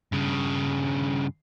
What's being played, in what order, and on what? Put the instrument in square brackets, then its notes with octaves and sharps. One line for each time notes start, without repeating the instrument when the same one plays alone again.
[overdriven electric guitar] G2 C#3